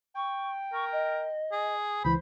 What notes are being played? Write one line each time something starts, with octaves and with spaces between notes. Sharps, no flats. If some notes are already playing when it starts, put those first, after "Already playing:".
G5 C#6
A#4 C#6
D#5
G#4
C#2 E3 C5 B5